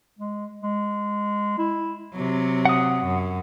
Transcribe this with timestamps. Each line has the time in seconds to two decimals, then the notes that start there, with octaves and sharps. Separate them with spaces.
0.19 G#3
0.63 G#3
1.59 E4
2.14 C3 F#3
2.65 F#5 D#6
3.05 F#2